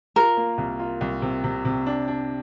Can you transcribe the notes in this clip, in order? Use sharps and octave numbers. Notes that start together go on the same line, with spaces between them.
F4 A#4
A#3
C2
F4
C2
C3
C3
C3
D4
D4